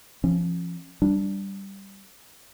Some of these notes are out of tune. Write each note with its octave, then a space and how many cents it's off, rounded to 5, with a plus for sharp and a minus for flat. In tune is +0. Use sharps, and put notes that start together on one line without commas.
F3 -20 C#4 -35
G3 +0 D4 +0